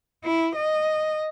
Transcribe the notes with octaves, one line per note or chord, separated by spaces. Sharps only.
E4
D#5